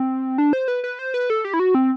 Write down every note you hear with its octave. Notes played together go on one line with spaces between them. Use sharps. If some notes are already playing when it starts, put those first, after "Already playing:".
Already playing: C4
D4
C5
B4
B4
C5
B4
A4
G4
E4
F#4
C4